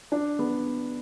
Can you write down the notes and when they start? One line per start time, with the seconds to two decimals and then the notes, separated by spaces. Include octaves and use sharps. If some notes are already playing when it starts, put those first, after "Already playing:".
0.12 D4
0.39 B3